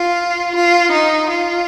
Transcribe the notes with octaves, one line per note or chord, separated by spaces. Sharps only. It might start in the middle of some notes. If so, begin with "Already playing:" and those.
Already playing: F4
F4
D#4
F4